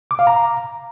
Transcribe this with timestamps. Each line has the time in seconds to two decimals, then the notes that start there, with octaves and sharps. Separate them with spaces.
0.11 D6
0.19 F5
0.27 A#5